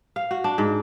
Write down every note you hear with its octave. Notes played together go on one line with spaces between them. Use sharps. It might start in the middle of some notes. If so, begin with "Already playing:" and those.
F5
F#4
D4
G#2